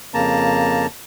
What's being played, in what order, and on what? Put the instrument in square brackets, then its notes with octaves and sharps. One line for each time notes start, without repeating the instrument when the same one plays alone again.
[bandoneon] F2 C#3 A#3 A5 A#5